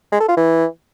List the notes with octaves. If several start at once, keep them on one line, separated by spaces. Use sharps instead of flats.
G#3
A4
F4
E3